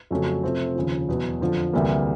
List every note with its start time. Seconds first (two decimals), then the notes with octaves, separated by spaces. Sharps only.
0.11 F2 C#3 F#3 A3 C#4
0.43 C3 F3 A3 C4
0.75 D#2 C#3 F3
1.08 E2 B2 F#3 B3
1.41 F2 D3 F3
1.73 D2 C3 E3 G3 A#3